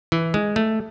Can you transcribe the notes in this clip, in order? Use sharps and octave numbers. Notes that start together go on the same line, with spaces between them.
E3
G#3
A3